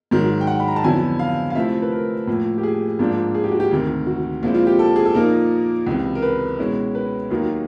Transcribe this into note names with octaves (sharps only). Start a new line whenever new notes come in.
G#2 D#3 F#3
G5
F#5
B5
A#5
A5
F2 D3 F#3 B3 E4 G#5
F5
F5
C3 F3 A3 C4 E4 E5
B4
A#4
A2 F3 A#3
G4
G#4
G#2 F3 A#3 D4
G#4
G4
F#4
G4
D2 C3 D#3
F#4
A#2 F3 G#3 C4 E4 F4
F4
G4
A4
G#4
A4
A#2 F3 A#3 D#4 A#4
C#2 C3 E3
A#4
B4
B2 G#3 C#4 E4
B4
D#2 D#3 F#3 A#3 D#4